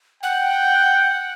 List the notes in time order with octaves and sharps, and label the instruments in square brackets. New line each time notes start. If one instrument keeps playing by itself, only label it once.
[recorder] F#5 [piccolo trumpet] G5